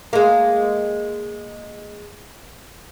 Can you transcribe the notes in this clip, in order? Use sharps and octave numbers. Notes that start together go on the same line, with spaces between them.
G#3 A#3